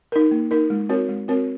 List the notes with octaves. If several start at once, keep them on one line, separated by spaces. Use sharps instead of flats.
D#4 A#4
A#3
D#4 A#4
G#3
C4 F#4 A#4 C#5
G#3
C4 F#4 A#4 C#5